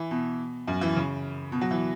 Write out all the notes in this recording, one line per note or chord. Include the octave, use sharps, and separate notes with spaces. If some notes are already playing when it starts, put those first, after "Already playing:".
Already playing: E3
B2
F#2
E3
C#3
B2
F#3
E3